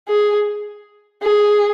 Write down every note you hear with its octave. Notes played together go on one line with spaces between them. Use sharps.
G#4
G#4